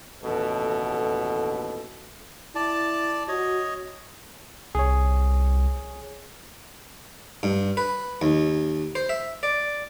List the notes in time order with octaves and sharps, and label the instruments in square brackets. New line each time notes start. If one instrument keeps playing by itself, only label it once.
[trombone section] A1 D#2 B2 D3 A4
[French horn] E4 [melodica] D5 A5
[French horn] F#4 [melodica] C#5 D#5
[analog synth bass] C2 [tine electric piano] G#4 C#5
[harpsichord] G2
B4
D#2
C5
E5
D5